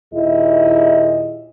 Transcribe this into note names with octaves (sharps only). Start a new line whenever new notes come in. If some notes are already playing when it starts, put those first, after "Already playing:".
D#2 A#2 E4 G#4 D#5